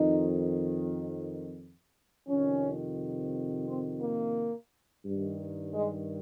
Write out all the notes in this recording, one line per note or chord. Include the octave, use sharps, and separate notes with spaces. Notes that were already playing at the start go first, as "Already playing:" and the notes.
Already playing: F2 D#3 D#4
F2 C3 D#3 C#4
C4
A#3
G2 D#3
G#3